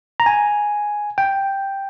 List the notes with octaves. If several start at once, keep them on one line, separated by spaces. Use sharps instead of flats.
A#5
G#5
G5